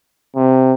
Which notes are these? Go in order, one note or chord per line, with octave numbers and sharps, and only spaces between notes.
C3